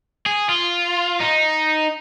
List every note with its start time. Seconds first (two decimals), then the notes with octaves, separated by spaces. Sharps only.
0.26 G#4
0.49 F4
1.20 D#4